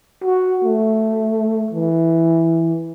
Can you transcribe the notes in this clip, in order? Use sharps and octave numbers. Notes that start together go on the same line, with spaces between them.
F#4
A3
E3